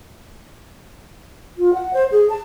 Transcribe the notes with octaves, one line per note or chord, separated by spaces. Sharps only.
F4
F#5
C5
G#4
A5